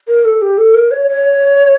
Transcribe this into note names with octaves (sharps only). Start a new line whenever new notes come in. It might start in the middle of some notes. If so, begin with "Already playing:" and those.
A#4
A4
G4
A4
A#4
C#5
C#5